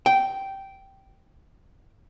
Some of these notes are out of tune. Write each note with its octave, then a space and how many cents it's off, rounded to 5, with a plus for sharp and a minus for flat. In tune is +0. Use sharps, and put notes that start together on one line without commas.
G5 -10